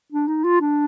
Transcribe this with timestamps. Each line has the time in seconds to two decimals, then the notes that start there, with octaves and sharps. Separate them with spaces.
0.12 D4
0.28 D#4
0.44 F4
0.61 D4